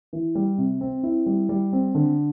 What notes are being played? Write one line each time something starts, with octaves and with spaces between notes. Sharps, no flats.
E3
G3
C3
C4
E4
G3
G3
C4
D3